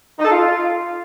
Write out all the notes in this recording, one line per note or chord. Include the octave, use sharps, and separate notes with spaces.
D#4
A4
F4